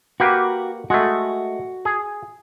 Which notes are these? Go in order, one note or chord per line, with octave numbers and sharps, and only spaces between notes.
A#3 F#4 G4 B4
G#3 A3 F#4
G#4